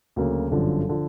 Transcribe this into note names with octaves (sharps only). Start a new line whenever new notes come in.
D2 C#3 F#3 A#3
G1 F#2 D3 F3
D3 F3